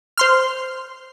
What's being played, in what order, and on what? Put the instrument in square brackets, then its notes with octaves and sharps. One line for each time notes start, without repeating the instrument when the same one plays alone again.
[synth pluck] C5 C6 F6